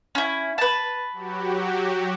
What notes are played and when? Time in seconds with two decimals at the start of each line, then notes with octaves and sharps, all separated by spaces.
0.15 C#4 E4
0.58 B4 A5
1.13 F#3 F#4 G4